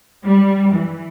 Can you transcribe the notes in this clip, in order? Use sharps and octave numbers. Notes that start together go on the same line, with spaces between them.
G3
E3